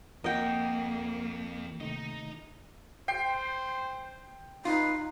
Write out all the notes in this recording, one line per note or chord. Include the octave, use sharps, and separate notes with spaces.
F2 A#3 A#4 D#5 F#5 G5
C3 D#3 A3 D#4 D#5
C5 G5 C7
D#4 F4 B4